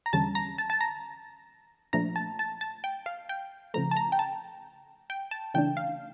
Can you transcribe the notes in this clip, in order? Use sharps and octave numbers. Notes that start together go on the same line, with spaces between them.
A#5
E2 D3 G3 C#4 A5
A#5
A5
A5
A#5
A#2 F3 A3 D4 A#5
A5
A5
A5
G5
F5
G5
C#3 F3 A3 A#5
A5
A#5
G5
A5
G5
A5
C#3 E3 A3 D4 G5
F5